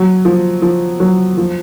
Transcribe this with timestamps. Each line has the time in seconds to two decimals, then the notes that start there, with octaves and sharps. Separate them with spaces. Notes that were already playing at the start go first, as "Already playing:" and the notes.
Already playing: F#3
0.25 F3
0.62 F3
1.00 F#3
1.37 F3